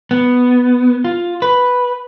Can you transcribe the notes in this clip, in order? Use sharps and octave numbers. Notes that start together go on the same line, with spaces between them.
B3
F4
B4